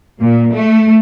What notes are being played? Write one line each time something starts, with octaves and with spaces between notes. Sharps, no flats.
A#2
A3